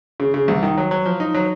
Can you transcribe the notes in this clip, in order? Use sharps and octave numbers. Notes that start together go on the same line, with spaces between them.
C#3
C#3
C2
D#3
F#3
F#3
F3
D#4
F#3